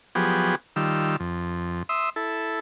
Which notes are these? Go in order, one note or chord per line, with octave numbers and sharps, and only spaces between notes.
F3 F#3 B3 G4 G#4
D#3 G3 F4 E6
F2
E5 C6 D#6 E6
E4 A4